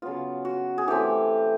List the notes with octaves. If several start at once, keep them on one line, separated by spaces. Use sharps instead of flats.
C#3 F#3 B3 F4
F#4
G#4
E3 A3 C4 G4